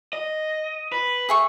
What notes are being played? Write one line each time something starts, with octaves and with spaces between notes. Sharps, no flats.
D#5
B4
G#4 E5 C#6